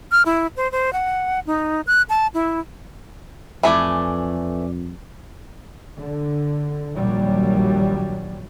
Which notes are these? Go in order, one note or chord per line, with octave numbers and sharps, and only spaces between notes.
F6
E4
C5
C5
F#5
D#4
F#6
A5
E4
F2 E3 A3 D5 G#5
D3
A#1 D#2 F#3 G3